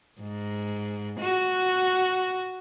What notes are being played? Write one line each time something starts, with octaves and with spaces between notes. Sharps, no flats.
G#2
F#4